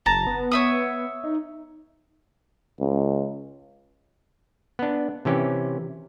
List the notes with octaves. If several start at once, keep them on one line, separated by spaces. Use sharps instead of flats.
F#1 A5 A#5
B3
C#5 E5 D#6
D#4
C#2
B3 D4
C3 E3 C#4 G4